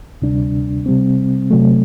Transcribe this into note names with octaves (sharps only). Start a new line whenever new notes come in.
D2 C3 G3 D4
C3 G3 C4
C3 F#3 A3